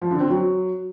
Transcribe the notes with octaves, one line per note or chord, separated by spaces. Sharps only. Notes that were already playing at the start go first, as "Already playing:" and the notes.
F3
D3
C4
F#3